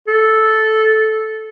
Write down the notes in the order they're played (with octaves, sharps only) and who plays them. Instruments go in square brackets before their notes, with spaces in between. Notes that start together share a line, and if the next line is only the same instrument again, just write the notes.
[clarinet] A4